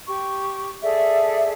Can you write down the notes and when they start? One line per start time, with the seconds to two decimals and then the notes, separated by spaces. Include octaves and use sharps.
0.08 G4 C#6
0.82 G#4 A4 D5 E5